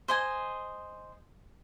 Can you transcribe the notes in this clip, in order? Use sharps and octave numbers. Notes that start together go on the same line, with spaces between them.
C5 D#5 G#5